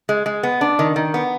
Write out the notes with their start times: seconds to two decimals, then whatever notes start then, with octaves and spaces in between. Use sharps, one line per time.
0.09 G#3
0.26 G#3
0.43 B3
0.61 D4
0.79 D#3
0.96 D#3
1.14 B3